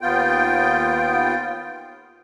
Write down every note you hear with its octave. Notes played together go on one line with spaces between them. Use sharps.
D#2 B3 F4 G5